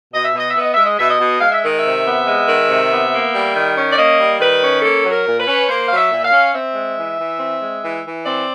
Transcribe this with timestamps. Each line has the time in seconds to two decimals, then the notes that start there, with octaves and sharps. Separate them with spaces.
0.13 B2 D#5
0.24 E5
0.33 B2 D#5
0.49 E5
0.55 B3
0.60 D#5
0.73 G#3 E5
0.85 D#5
0.97 B2 E5
1.10 D#5
1.19 B2
1.40 G#3 F5
1.52 E5
1.62 D#3 D#5
1.77 E5
1.83 C3
2.05 B3
2.26 G#3
2.47 D#3
2.68 C3
2.90 B3
3.12 A#3
3.33 G3
3.54 D#3
3.75 C#4
3.91 D5
3.96 A#3 D#5
4.18 G3
4.39 D#3 B4
4.61 C#4
4.82 A#3 A4
5.04 F#3
5.11 A#4
5.25 A#2
5.40 B4
5.46 C#4
5.68 A#3 C5
5.88 F#3 F5
5.96 E5
6.11 A#2
6.24 F5
6.32 C#4
6.54 C4 E5
6.74 G#3
6.97 E3
7.17 E3
7.39 C4
7.61 G#3
7.81 E3
8.03 E3
8.24 C4 D5